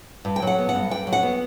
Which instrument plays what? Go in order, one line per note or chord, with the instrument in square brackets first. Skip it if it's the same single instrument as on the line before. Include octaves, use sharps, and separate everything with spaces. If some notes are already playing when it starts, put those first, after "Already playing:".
[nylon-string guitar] G2
G5
F#3 F#5
B3
F#5
G2
G2 G5
F#3
F#5
B3